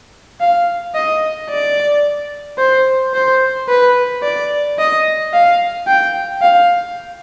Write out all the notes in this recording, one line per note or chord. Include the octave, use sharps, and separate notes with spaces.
F5
D#5
D5
C5
C5
B4
D5
D#5
F5
G5
F5